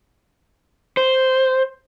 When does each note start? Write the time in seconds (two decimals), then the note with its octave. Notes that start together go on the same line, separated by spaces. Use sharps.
0.97 C5